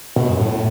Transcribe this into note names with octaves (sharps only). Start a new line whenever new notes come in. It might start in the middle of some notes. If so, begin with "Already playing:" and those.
B2
F#2
A2